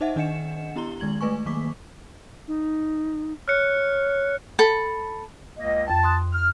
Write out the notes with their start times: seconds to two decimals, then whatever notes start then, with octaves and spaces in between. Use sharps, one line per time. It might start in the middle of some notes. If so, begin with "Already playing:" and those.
0.01 D#4 C5 D#5 E5 F#5
0.16 D#3 D4 D#5 F#5 C#7 E7
0.76 B3 E4 G4 A#5 C6 G7
1.00 D#3 G#3 G#6 F#7
1.21 G#3 A3 B4 G#5 C#6
1.46 D#3 F#3 A#3 C#6 D6 B6
2.47 D#4
3.48 C#5 F6 F#6 C#7
4.59 A4 B5
5.57 C#2 A#3 D#5
5.88 F2 G5 A5
6.03 C6 D#6 F#6
6.33 F6